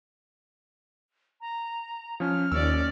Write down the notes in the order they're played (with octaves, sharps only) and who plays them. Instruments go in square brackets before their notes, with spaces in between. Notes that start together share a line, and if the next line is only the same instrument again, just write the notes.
[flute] A#5
[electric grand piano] F3 C#4 [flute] F6
[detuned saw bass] D#2 [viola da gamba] C#4 D5 [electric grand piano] E6